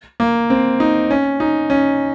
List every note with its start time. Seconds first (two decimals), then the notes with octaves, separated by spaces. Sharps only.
0.20 A#3
0.50 C4
0.80 D#4
1.11 C#4
1.40 D#4
1.70 C#4